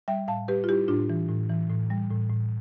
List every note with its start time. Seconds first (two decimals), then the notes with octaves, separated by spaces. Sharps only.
0.08 G3 E5 G5
0.28 A2 F5 A5
0.48 G3 G4 B4
0.64 F4
0.69 G3 E4 G4
0.88 A2 D4 F4
1.10 E3
1.29 A2
1.49 E3
1.70 A2
1.90 G3
2.10 A2
2.30 A2